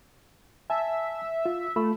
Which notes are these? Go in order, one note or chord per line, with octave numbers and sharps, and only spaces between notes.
E5 G#5 A5
F4
A3 F4 B5 E6